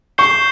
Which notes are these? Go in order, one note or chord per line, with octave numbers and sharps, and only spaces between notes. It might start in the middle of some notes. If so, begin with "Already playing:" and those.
C#6 G6 C7 E7 G7